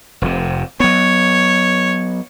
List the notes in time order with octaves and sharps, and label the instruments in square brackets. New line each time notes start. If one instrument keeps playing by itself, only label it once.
[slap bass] F1 C3
[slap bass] F#3 B3 [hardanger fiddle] C#5